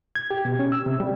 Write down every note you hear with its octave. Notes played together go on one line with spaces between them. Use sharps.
G#6
G4
B2
C#4
E6
C3
G3